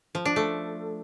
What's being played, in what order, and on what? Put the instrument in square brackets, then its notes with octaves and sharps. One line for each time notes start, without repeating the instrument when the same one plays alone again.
[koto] F3
D4
A3